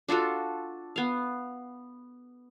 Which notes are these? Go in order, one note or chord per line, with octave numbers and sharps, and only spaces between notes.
D4 F4 F#4 A4
B3 F5